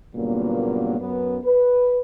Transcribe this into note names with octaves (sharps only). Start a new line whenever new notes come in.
G2 A#2 C#3 F#3 A#3 B3
F#2 B3
B4